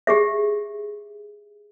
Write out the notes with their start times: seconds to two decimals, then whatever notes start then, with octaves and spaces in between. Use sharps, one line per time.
0.07 G4 G#4 E5